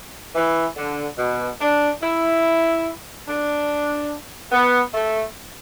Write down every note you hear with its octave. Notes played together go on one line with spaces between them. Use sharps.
E3
D3
B2
D4
E4
D4
B3
A3